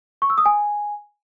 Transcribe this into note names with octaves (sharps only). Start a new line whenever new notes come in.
C#6
E6
D#6
G#5